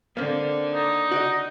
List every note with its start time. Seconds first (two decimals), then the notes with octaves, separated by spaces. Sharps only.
0.17 D3 A#3 C4
0.71 D#4
1.11 F#4 D5 D#5